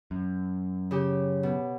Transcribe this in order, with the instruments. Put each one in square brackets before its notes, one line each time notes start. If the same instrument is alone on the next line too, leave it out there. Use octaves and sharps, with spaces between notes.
[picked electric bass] F#2
[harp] C#3 G4
B2